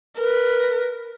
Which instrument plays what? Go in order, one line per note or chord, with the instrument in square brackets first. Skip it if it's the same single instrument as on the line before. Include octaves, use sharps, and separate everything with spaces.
[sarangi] A#4 [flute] B4